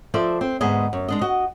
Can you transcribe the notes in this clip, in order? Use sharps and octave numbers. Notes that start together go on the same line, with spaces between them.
F3 A4 C5 D5 E5
C4
D2 G#2 B3 G#4 D#5
F#2
G#3 D4 D#5
F#4 D#5